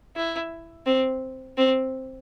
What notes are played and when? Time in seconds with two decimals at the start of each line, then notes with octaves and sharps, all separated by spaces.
0.16 E4
0.86 C4
1.58 C4